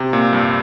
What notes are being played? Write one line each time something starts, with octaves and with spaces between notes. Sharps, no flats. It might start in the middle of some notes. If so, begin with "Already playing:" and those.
Already playing: C3
A#2
G2